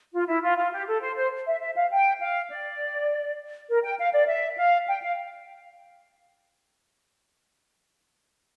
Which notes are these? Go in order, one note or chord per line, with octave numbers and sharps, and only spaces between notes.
F4
E4
F4
F4
G4
A4
C5
C5
E5
E5
F5
G5
F5
D5
A#4
G5
F5
D5
E5
F5
G5
F5